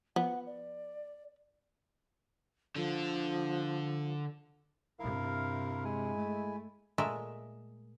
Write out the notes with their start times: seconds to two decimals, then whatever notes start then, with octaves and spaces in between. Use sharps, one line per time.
0.16 F3 B3 F#5
0.46 D5
2.76 D3 F3 D4
4.99 G2 C3 E4 A#4 F5
5.85 G#3 E4 G#5
6.16 A3
6.98 A#2 G#3 A3 A#4 E5 A5